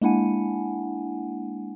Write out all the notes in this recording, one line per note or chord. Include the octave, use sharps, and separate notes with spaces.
G#3 A#3 D4 E4 F#5 G#5